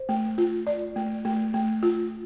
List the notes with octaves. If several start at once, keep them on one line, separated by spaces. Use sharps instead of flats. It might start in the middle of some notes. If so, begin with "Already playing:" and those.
Already playing: C5
A3
F4
D5
A3
A3
A3
F4